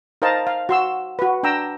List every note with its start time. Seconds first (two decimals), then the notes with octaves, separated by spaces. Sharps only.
0.22 D#4 A#4 C5 D#5 F5 A5
0.47 F5
0.69 F#4 C6 E6
1.19 F#4 B4
1.43 D4 G5 A#5 E6